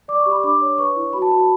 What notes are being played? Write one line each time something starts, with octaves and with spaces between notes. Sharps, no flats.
D5 D6
C#6
G4
B5
D4 D6
C#5
B4 C#6
E4
F#4 B5
A5
F#4 B5
A5